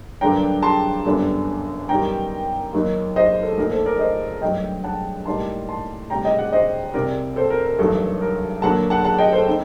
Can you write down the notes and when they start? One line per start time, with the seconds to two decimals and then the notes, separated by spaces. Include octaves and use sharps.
0.21 G2 D3 F#3 A#3 D4 G5 A#5
0.63 A5 C6
1.06 G1 F#2 D3 G3 D4
1.89 F#2 D#3 G3 G5 A#5
2.73 D#2 D#3 F#3 A#3 D#4
3.16 C5 D#5
3.43 A4
3.58 A#1 A#2 A3 D#4 A#4
3.71 A4 C5
3.85 A#4 D5
3.99 C5 D#5
4.41 G2 F#3 A3 D#5 G5
4.84 F#5 A5
5.25 A2 G3 A#3 D#4 A5 C6
5.69 A5 C6
6.10 D2 C3 G3 G5 A#5
6.24 D#5 G5
6.39 D5 F#5
6.53 C5 D#5
6.94 C2 C3 G3 C4 A#4 D5
7.36 A4 C5
7.50 A#4
7.65 A#4
7.78 A1 G2 D#3 F#3 A4
8.21 A#4
8.62 D#2 D3 F#3 A#3 F#5 A5
8.90 F#5 A5
9.04 F#5 A5
9.18 D#5 G5
9.32 A4 C5
9.47 C4 D#4